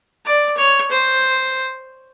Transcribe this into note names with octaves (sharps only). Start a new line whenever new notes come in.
D5
C#5
C5